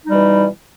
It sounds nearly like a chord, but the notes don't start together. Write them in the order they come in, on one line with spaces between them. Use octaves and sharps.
D#4 G3 B2 E3